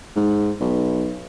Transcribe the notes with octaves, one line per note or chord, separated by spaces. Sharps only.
G#2
B1